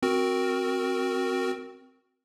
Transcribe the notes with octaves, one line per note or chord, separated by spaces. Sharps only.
C4 F#4 A#4